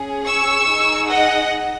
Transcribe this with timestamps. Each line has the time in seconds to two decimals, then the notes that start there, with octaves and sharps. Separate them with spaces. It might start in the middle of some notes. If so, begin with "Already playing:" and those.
Already playing: C#4 G#4
0.26 C#6 E6
0.68 D#4 G#4
1.10 D#5 F#5